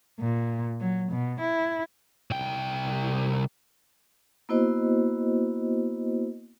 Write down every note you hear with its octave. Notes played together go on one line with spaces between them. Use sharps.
A#2
F#3
B2
E4
C2 G5
A#3 B3 E4 F#4 C5 D#5